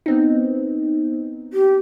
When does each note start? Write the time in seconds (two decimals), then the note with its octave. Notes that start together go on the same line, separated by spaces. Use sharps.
0.06 B3 C4 D#4
1.53 G4